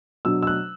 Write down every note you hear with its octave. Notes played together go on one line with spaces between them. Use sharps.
B2 F#3 D4 E6
E6
F#6